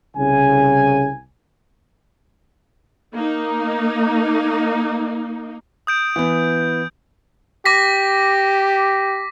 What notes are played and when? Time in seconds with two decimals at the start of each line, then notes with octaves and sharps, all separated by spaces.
0.17 C2 C#3 G#5
3.13 A#3 D#4
5.87 D#6 G6 D7
6.16 E3 B3
7.66 G4 D6 A#6 B6